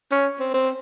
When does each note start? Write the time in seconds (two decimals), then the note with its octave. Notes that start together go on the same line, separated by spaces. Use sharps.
0.12 C#4
0.40 C4
0.54 C4